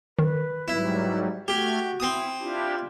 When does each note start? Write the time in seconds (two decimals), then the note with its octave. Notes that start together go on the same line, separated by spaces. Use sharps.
0.19 D#3 B4
0.68 G#2 F#3 G3 E4
1.48 A3 F#4 G4 F6 G#6
2.00 C4 E4 D#6
2.40 D4 E4 F4 G4